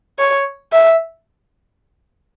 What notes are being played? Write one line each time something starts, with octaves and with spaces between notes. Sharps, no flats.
C#5
E5